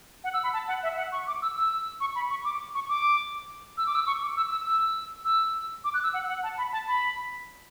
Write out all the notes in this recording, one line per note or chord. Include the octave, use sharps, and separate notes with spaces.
F#5
E6
B5
A5
F#5
E5
F#5
C#6
D6
E6
E6
C#6
B5
C#6
D6
C#6
D6
E6
D6
E6
C#6
D6
E6
E6
E6
E6
D6
F#6
E6
F#5
F#5
A5
B5
A5
B5